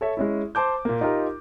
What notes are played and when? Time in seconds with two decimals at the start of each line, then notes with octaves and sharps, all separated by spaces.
0.01 A4 C#5 E5
0.17 G#3 C#4 E4
0.55 C5 A5 D6 G6
0.85 A#2 A#3
1.01 D#4 F4 G4 A#4